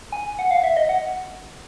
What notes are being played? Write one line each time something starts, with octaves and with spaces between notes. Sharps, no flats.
G#5
F#5
F5
E5
D#5
F#5